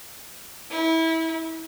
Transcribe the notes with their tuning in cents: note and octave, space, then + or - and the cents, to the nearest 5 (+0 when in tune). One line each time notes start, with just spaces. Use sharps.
E4 -25